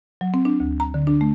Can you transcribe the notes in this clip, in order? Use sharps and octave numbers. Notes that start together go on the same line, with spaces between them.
F#3
C4
D4
D2
A#5
D3
D4
A3